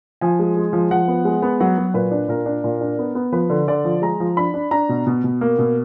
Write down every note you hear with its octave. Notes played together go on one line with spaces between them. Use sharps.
F3 G#5
G#3
G#3
F3
F3 F#5
B3
G#3
B3
F#3 F#5
F#3
A#2 B4
D4
A#2 A#4
D4
A#2
D4
B3
B3
F3 B4
D3
D3 D5
F3
G#3 A#5
F3
D4 B5
D4
D4 A#5
B2
B2
B2
A#3
B2